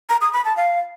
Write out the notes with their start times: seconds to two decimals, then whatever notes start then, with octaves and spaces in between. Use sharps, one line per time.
0.09 A#5
0.21 D#6
0.33 B5
0.45 A5
0.57 F5